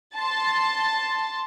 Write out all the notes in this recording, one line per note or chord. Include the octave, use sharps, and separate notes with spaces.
A5 C6